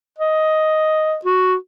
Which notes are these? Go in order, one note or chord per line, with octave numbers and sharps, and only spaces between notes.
D#5
F#4